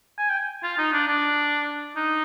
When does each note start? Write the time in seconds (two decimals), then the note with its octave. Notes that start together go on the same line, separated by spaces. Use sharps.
0.18 G#5
0.30 G5
0.63 F4
0.78 D#4
0.93 D4
1.08 D4
1.96 D#4